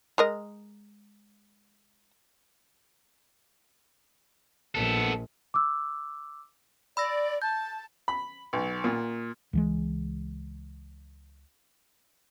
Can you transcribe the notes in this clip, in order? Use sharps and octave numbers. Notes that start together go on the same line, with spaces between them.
G#3 A#4 D#5
A#1 B3 A4
D6 E6
D5 B5 E6 A#6
A5 G6
B5
B1
A#2
C#2 E3 G#3